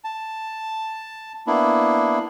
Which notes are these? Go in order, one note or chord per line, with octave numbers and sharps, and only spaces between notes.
A5
A#3 B3 D4 E4